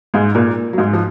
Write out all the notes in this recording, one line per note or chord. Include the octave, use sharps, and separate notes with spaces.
G#2 G#3
A#2 A#3
F#3
G#2 G#3
F3